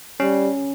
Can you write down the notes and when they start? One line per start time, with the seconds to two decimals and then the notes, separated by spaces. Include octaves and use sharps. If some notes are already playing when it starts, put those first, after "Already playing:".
0.20 G3 C#4